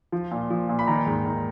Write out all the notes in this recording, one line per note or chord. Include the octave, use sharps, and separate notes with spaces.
F3
A#2
F3
A#2
B5
D#3 A#5
G#2
D#3